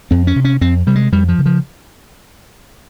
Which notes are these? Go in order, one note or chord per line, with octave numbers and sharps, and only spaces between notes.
F2 C4
C#4
C3
C#4
F2 C4
C3 G3
G#3
F2 G3
F3
C#3
F3